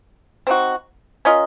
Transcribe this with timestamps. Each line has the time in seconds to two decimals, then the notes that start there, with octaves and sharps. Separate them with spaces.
0.47 C4 D#4 F#4
1.25 C#4 F4 A#4 D#5